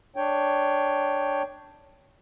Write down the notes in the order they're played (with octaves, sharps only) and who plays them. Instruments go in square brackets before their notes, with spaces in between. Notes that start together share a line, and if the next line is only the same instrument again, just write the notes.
[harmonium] D4 C#5 G5